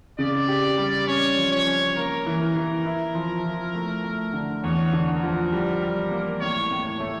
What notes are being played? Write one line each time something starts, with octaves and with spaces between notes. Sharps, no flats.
C#3 D5
G4
G3
C#4 C#5
F3
C#5
C#4
A#3 A#4
E3
A#4
E3
E4
F3
F3
A3
A3
D3
E2 C#5
D3
A#4
F3
G3
G3
A#3
A2 C#5
A2
C#5
A3